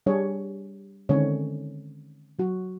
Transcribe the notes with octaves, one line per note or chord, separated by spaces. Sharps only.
G3 D4 G#4 C#5
D3 D#3 G#3 C4 C#4 C#5
F#3 F#4